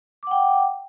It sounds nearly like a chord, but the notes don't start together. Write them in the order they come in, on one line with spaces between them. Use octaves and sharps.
D6 F#5 G5